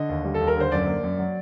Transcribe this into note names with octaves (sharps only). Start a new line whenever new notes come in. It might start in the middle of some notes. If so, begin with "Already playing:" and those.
Already playing: D3 D#5
D#2
G3
A4
D#2
A#4
D3 C5
F#2 D5
A#3
F#2
F#3